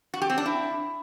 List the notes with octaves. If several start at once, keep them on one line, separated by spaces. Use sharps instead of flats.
F#4
G4
C4
D4
E4